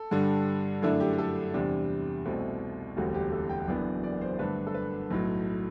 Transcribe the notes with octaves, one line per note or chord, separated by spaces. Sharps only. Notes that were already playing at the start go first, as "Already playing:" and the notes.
Already playing: A4
G2 D3 G3
F#2 D3 A3 D4 E4
G4
G4
A4
E2 C3 G3 D4
C2 B2 A3 C4
E1 D2 D3 G3 C4 F#4
G4
A4
G5
F#1 F#2 E3 B3 D4 D5
D5
C5
G2 D3 A3 D4 B4
A4
B4
B1 A2 F#3